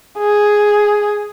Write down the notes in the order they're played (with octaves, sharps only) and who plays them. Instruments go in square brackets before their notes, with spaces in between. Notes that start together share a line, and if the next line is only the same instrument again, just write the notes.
[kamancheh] G#4